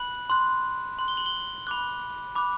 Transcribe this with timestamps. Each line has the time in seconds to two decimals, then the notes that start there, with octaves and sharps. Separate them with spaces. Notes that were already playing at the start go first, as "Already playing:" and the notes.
Already playing: B5 F#6 F#7
0.30 C6 F#6
0.99 C6 F#6
1.08 G7
1.17 F#7
1.26 G7
1.67 B5 D6 F#6
2.35 B5 D6 F#6